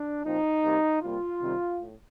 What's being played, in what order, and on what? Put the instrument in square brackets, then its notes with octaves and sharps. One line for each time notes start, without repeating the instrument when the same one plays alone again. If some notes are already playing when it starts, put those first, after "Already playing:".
Already playing: [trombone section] D4
A#2 F3 C4 D#4
C3 G3 A#3
C3 G3 A#3 F4
C3 D#3 G3 C4
A2